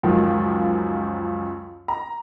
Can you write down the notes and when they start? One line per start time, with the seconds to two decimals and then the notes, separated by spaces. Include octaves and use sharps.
0.03 C#2 F#2 D#3 F3 F#3
1.88 A#5